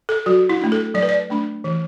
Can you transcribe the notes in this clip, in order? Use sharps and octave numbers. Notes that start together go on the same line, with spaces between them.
A4
F#3 F#4
E4
A3 D4
A4
F#3 D5
B4
D5
A3 D4
E3